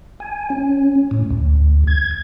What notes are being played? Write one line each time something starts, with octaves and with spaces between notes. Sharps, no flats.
G#5
C#4
A2
D2
G#6